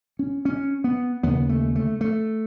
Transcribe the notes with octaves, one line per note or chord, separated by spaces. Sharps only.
C#4
C#4
B3
D#2 C#3 B3
A3
A3
A3